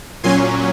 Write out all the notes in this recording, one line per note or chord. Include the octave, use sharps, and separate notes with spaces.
A#2 F#3 C#4 G#5 C6